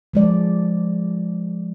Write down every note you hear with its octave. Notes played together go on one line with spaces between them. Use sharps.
F3 G#3 D5